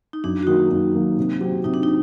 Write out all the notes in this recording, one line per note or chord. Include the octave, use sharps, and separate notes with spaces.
D#4
F#2 D4
F#4
D#3 F#3 A#3 D#4
F#2
D#3 F#3 A#3
C3
F#3 C4 G4
C3 D#4
D4
D#4